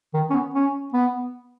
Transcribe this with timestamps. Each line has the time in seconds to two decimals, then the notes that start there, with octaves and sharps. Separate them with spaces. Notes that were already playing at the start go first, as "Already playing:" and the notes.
0.14 D#3
0.30 C#4
0.33 B3
0.54 C#4
0.93 B3